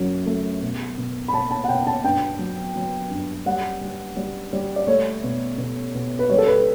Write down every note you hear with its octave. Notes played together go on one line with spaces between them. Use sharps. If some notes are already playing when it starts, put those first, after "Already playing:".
Already playing: F#2 F#3
A3
B2
B2
B5
B2 A5
A5
F#5
B2 G5
A5
G2 G5
F#3
F#3
G2
G3 F#5
G3
G3
G3
D5
A3 C#5
B2
B2
B2
B4
G3 C#5
A4
B4